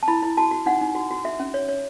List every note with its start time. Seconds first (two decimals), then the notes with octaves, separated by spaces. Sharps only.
0.03 A5
0.08 E4 B5
0.23 E4
0.37 F#4 A5
0.51 F#4
0.66 D#4 F#5
0.81 D#4
0.95 F#4
1.11 F#4
1.25 F#4 E5
1.40 C#4
1.54 C#5
1.69 C#5